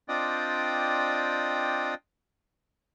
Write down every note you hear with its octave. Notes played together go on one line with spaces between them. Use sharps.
C4 D4 F4 D5 D#5 G5